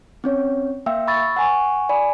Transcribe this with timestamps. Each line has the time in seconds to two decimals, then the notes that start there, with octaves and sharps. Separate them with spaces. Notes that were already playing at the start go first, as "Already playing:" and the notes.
0.24 C4 C#4 C#5
0.86 A#3 E5 F5 G5 E6
1.08 B5 C#6 E6 A6
1.36 F#5 G#5 C#6
1.89 D5 G#5 B5